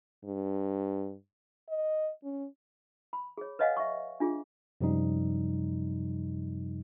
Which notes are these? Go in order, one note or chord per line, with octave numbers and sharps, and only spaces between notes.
G2
D#5
C#4
B5
G#4 C#5
B4 C#5 D#5 F5 F#5 G#5
E5 C#6
D4 F4 G#4
F#2 C3 F3 G3 D#4